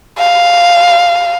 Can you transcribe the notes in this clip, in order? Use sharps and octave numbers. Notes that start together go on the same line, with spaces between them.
F5